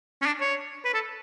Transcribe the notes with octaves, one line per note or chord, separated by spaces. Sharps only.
C#4
D4
C#5
B4
A4